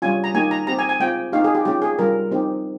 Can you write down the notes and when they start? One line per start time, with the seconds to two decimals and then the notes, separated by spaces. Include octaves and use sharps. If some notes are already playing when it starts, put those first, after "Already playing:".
0.02 G3 C#4 F4 G#5
0.24 A#5
0.34 A#3 D#4 G4 G#5
0.51 A#5
0.67 C4 G4 A#5
0.79 G#5
0.89 G#5
1.00 G#3 C4 F4 G5
1.33 A#3 D#4 G4 F5
1.44 G#4
1.55 G4
1.65 G#3 C#4 F4 G4
1.82 G#4
1.99 G3 C#4 F4 A#4
2.31 C4 D#4 G4